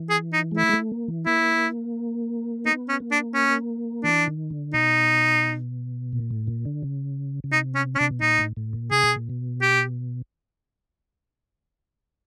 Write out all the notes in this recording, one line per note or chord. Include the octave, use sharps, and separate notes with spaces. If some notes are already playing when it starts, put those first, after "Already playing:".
Already playing: E3
G#4
D#4
G#3
A3 E4
G#3
A3
A#3
E3
A#3 E4
B3 D#4
C#4
A#3
D4
C#4
E3 D4
D#3
D3
B2 D#4
A#2
A2
A#2
D3
C#3
C#3
C3 D#4
C#4
C#4
C3 D4
B2
A#2 D#4
A2
A2
A#2
C3 G#4
B2
A#2
B2
G4